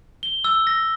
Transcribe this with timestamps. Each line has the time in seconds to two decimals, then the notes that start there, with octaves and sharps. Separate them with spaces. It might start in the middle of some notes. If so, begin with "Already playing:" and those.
0.23 G7
0.44 E6
0.67 A#6